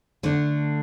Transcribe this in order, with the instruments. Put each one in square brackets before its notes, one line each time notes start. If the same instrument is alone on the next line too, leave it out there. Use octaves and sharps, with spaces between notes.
[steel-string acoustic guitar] D3 A3 D4